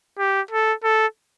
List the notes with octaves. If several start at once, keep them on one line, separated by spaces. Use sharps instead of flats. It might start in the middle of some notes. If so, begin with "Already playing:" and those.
G4
A4
A4